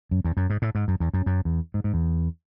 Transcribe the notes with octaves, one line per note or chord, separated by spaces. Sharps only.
F#2
E2
F#2
G#2
A2
G#2
F#2
E2
F#2
F#2
E2
G#2
G#2
E2